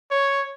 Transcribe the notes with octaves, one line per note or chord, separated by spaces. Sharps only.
C#5